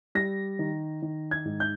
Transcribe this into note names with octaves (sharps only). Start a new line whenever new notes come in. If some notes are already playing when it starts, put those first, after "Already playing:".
G3 A#6
D#3
D#3
G#6
G#2
G6